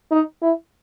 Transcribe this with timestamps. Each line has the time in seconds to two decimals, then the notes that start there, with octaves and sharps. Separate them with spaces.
0.12 D#4
0.42 E4